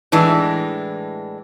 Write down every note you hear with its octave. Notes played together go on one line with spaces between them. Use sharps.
A2 E3 G#3 D4